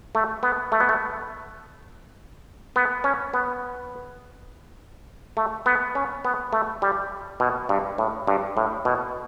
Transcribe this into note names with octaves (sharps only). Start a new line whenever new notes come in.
A3
B3
A3
B3
A3
B3
C#4
B3
A3
B3
C#4
B3
A3
G3
B2
G2
A2
G2
A2
B2